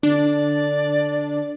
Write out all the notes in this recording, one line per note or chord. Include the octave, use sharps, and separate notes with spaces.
D3 D4 D5